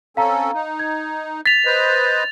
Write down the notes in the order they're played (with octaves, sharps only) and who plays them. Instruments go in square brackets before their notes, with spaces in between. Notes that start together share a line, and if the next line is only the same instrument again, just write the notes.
[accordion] C4 C#4 A4 [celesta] F5 A#5
[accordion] D#4
[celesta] G#6
[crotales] A6 F7 [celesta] B6
[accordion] B4 C5 D#5